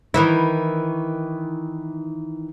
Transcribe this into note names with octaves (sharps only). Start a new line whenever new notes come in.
D#3 E3 E4